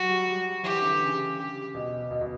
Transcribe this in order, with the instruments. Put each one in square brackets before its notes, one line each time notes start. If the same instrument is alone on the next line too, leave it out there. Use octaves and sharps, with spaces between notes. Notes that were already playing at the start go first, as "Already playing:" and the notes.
Already playing: [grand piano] F#3 [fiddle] F#4
[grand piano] G3
G3
[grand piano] E3 [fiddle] G4
[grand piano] D3
C#3
[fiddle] G4
[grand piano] B2
B2
B2